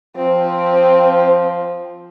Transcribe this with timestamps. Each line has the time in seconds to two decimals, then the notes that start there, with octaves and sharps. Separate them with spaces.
0.17 F3 C4